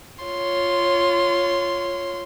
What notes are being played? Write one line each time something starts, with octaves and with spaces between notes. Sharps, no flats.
F4 C#5 C6